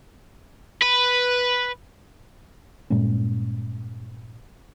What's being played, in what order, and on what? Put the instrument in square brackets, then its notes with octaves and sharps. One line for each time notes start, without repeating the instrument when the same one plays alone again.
[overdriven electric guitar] B4
[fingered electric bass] G2 A#2 G#3 C#4